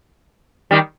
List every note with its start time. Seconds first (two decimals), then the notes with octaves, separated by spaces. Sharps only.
0.71 D#3 G3